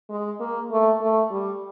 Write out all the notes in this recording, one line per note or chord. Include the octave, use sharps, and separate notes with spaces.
G#3
A#3
A3
A3
G3